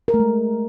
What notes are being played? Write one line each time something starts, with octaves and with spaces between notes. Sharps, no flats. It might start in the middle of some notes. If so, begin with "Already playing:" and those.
A#4
A3
G#3